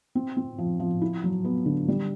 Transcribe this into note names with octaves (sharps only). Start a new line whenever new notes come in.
C4
C4
F3
F3
E4
F#3
B3
D3
G3